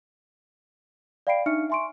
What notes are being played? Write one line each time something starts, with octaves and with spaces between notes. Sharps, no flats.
D5 F5 G5 B5 C7 D7
D4 D#4 E5 C#6 F6 C#7
E5 G#5 C6 C#6 D7